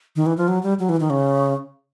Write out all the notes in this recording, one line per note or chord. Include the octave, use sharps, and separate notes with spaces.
D#3
E3
F3
F#3
G3
F#3
E3
D#3
C#3